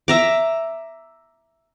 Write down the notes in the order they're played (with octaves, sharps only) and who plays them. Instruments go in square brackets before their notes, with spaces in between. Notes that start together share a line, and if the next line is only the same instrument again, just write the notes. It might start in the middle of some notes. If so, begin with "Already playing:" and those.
[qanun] E5 A#5 D6